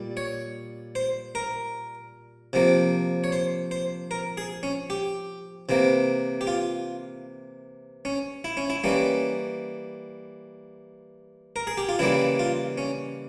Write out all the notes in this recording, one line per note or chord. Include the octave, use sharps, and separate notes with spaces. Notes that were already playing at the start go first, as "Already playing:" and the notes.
Already playing: A#2 G3
C#5
C5
A#4
C3 F3 A#3
C#5
C5
C5
A#4
G#4
C#4
G4
C3 E3 A#3
G4
F4
C#4
E4
C#4
E4
E3 G3 A#3 C#4
A#4
G#4
G4
F4
C#3 E3 G3 A#3 E4
F4
C#4